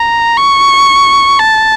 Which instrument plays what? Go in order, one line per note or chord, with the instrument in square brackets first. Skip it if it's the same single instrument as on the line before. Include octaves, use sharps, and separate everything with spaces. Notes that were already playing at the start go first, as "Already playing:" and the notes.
Already playing: [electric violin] A#5
C#6
A5